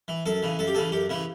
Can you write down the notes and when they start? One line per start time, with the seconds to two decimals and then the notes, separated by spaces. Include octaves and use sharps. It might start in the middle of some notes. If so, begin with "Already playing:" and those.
0.08 E3
0.26 F#2 A4
0.43 C#3 E3
0.59 F#2 A4
0.67 G4
0.75 C#3 E3 A4
0.92 F#2 G4
1.09 C#3 E3 E4